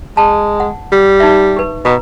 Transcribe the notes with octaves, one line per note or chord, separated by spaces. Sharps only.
G#3 A5
F#5
G3
D#4 E5
G4 B4
B2 B4 A#5